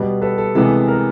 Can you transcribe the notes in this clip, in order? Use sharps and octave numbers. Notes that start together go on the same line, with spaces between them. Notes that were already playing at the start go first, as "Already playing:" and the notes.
Already playing: B2 G3 B3
A4 B4
A4
C3 E3 G#3 B3 A4
A#4